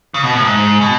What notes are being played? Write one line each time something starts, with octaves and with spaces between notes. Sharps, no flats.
C#3
B2
A2
G#2
B2